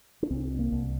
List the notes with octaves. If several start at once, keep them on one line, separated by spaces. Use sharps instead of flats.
D4
C2 C4
A#3
C2